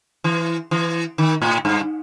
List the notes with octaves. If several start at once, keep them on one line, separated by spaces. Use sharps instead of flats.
E3
E3
D#3
A2
G2